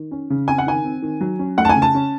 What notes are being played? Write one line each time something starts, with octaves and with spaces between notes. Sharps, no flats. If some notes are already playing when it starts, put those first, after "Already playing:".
Already playing: D#3
C#4
C#3
C4 G#5
F#5
D#3 G#5
C4
D#3
F#3
C#4
A3 F#5
A5
G#5
C#3
A5
C#4